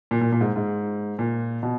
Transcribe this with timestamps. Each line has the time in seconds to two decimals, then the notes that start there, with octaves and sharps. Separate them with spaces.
0.11 A#2
0.21 A#2
0.32 A#2
0.41 G#2
0.56 G#2
1.19 A#2
1.63 B2